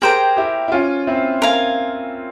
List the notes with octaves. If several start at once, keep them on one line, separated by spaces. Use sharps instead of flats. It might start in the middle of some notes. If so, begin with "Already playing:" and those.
G4 G#4 A#4 C5 G5 A#5
E4 G4
E4
C#4 F4
C4 E4
A#4 F5 G#5